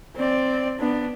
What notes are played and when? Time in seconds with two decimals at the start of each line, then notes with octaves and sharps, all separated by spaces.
0.16 C4 D5
0.79 B3 D4